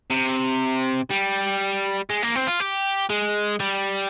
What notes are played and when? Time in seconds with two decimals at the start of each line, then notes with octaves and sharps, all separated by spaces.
0.11 C3
1.10 G3
2.10 G#3
2.23 A#3
2.36 C4
2.47 F4
2.60 G4
3.10 G#3
3.60 G3